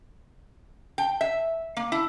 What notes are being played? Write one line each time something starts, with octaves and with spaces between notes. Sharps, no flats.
G5
E5
A#3
E4